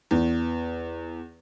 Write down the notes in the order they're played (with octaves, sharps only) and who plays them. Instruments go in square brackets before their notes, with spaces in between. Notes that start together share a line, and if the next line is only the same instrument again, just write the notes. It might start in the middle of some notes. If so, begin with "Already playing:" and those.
[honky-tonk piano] E2